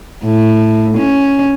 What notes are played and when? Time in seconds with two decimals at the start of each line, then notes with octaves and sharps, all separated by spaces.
0.24 A2
0.98 C#4